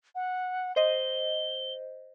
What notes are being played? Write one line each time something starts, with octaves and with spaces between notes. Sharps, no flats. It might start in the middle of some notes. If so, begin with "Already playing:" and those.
F#5
C5 D#5 G7